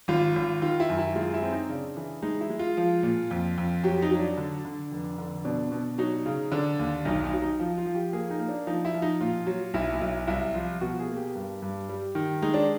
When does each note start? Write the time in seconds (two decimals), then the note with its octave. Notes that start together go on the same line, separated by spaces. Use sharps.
0.08 G#1 F4
0.36 G#1
0.62 D#3 F4
0.80 E4
0.90 F#2
0.98 E4
1.15 G#3 F4
1.33 E4
1.42 C4
1.52 D#4
1.69 C#3 D4
1.97 E3
2.22 G#3 D#4
2.41 E4
2.50 G#3
2.59 F4
2.77 F3
3.03 A#2
3.31 F2
3.58 F2
3.84 F#3 G4
4.02 D#4
4.11 F#3
4.19 D4
4.38 D3
4.65 D3
4.91 F1
5.18 D3
5.45 B2 D4
5.72 B2
5.98 F#3 D#4
6.26 C#3
6.52 D3 D4
6.79 D#2
7.05 B1 D#4
7.24 D#4
7.33 F#3
7.42 D#4
7.59 F3
7.78 F4
7.86 F3
7.95 G4
8.13 A#3 G#4
8.30 D#4
8.39 A#3
8.48 D4
8.67 F3 D#4
8.85 E4
8.94 F3
9.02 D#4
9.21 A#2 F4
9.46 F#3
9.74 B1 E4
10.01 B1
10.27 C2 E4
10.55 F3 F4
10.81 B2 F#4
11.00 G#4
11.08 A#3
11.16 G4
11.35 G2
11.62 G2
11.89 G3
12.15 D#3
12.42 G#3 D#4
12.54 D4